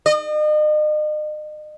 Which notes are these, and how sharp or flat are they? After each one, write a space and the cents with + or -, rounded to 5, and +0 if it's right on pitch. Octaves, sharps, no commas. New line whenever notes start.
D#5 -40